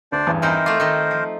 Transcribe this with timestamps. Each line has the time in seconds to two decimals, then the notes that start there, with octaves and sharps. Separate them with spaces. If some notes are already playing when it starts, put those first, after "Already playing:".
0.12 D2 D4 C5 D5
0.27 A1 E2 G2
0.42 E3 C4 D#4 A#4 C5
0.66 A3 F4 D6
0.80 D#3 D#4
1.11 F3